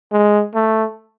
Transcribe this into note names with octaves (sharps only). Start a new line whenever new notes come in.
G#3
A3